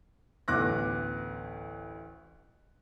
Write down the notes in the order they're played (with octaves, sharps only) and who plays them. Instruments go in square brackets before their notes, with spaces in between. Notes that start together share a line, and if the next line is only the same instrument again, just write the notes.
[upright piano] A1 D2 B3 D6 F#6 A#6